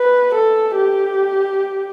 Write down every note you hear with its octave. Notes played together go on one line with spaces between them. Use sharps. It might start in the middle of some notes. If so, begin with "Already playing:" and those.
Already playing: B4
A4
G4